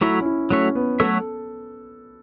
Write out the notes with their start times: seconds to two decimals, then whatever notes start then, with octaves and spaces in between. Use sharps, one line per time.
0.01 F#3 A3 E4 F#4 C#5 E5
0.21 C#4
0.26 E4
0.51 F#3 A3 C#4 F#4 C#5 E5
0.75 B3
1.00 F#3 A3 F#4 A4 C#5 E5